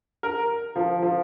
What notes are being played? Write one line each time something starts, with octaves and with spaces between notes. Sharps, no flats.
A#4
F3
F3